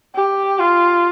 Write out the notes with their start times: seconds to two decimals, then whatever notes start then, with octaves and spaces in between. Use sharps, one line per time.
0.15 G4
0.59 F4